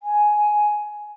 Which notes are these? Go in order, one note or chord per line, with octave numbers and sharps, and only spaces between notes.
G#5